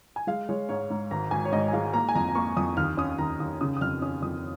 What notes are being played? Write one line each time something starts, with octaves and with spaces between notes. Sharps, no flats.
G#5
G#3 F5
G#3 C#5
G#2 C#5
G#2
G#1 A#5
G#1 G#5
C#5
G#2 D#5
G#5
G#3 F5
A#3 A#5
G#5
F2 A#5
A#5
A#3 C#6
F2 D#6
D#2 F6
C#4 D#6
D#2 A#5
D#2 D#6
C#3 D#6
D#6
F2 F6
C#4 D#6
F2 D#6